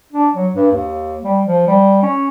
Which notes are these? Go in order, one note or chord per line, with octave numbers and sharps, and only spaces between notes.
D4
F#3
G2
D#2
G3
F3
G3
C#4